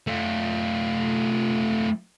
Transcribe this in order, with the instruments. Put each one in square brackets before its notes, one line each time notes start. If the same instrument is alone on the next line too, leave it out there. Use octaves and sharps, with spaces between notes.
[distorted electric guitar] A3 F4